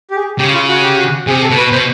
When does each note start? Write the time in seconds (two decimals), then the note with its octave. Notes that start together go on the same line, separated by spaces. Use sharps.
0.11 G4
0.16 G#4
0.39 C#3 G4
0.54 F4
0.68 F#4
0.82 G4
0.96 F#4
1.27 C3 G#4
1.43 A4
1.50 B2
1.57 B4
1.72 B2 C5